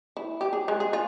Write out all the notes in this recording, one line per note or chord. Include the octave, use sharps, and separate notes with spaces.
E4
G4
G#4
G#3
G#4
F4